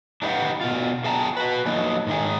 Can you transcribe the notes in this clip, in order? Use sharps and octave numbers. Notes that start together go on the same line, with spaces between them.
D4 D#4 G4 B4 F5 F#5
B2 F4
G#4 F5 G5 A5 A#5
F#4 B4
D3 F3 F#3 A#3 D#4
G#2 D#3 G#4